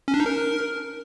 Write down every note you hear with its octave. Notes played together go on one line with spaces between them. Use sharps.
C#4
D4
D#4
A#4